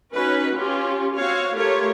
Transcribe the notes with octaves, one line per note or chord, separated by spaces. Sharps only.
C#4 D#4 F#4 B4
C#4 F4 G4
C4 F#4 C#5 F5
A3 F4 G4 A#4 C#5